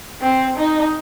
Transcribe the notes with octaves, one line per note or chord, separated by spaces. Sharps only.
C4
D#4